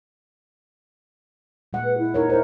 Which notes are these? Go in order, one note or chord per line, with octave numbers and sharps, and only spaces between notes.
A#2 G#3 F#5
B4
E4
D#4 A#4 C#5
E4 A#4 C5